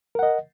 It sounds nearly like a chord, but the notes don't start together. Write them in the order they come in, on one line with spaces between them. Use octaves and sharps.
A#4 F#5 D#5